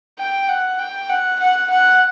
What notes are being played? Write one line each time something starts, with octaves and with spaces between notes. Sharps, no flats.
G5
F#5
G5
F#5
F#5
F#5